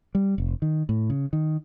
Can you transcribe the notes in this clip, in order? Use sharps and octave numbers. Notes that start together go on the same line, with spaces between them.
G3
F1
D#3
A2
C#3
D#3